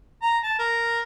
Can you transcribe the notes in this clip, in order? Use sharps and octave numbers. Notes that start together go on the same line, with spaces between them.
A#5
A5
A#4